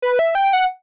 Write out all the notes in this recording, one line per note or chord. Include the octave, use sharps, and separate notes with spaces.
B4
E5
G5
F#5